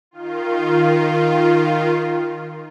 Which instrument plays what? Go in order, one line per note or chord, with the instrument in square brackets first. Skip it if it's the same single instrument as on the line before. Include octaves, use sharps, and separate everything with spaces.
[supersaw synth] D#3 F4